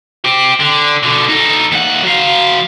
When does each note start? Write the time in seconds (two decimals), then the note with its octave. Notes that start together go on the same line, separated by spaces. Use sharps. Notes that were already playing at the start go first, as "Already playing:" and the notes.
0.25 C4 G4
0.60 D3
1.03 B2 D3
1.29 D#4 A4
1.72 D#2 F#5
2.03 F#3 F5